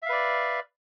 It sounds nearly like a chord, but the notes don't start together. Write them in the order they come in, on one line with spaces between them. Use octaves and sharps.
E5 F5 B4 D5